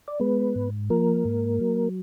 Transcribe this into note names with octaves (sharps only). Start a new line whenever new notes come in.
D5
G#3 B3 B4
G#2
F3 A#3 A#4
G#2
F#3